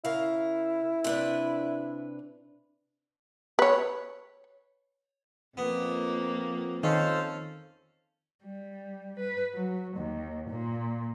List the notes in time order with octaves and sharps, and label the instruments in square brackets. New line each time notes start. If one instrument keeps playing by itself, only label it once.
[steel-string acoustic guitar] C#3 A#4 F5 [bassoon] E4
[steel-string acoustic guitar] C3 D4 B4
[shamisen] B4 C#5
[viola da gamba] F2 F3 A#3 [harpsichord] B3
[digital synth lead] D#3 [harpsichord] C#4 [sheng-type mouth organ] A4 C5 F5
[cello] G3
B4
F#3
D#2
A#2